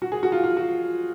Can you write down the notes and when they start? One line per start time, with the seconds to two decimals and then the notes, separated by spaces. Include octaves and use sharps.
0.02 F#4
0.12 G#4
0.23 F#4
0.32 F4
0.44 F4
0.57 F#4